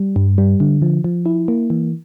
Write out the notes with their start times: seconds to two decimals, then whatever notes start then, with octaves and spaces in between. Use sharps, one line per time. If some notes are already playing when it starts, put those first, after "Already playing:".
Already playing: G3
0.16 G2
0.38 G3
0.60 D3
0.82 F3
1.04 F3
1.26 E4
1.48 A#3
1.70 E3